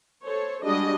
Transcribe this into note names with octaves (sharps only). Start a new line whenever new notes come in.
A4 C5 C#5
G3 G#3 D4 F#4 G#4 D#5